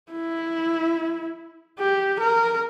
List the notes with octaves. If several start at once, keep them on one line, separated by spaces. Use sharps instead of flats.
E4
G4
A#4